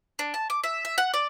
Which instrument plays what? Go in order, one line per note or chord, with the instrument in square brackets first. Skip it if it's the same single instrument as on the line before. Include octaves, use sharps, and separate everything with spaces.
[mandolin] D4
A5
D6
E5
E5
F#5
D5